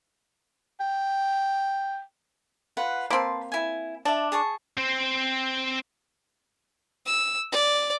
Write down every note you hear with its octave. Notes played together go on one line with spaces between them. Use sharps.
G5
F4 B4 F#5
A#3 C4 B4 A5 C6
E4 G#5
D4 E5 A5
G#4 A5 C#6
C4 C5
E6
D5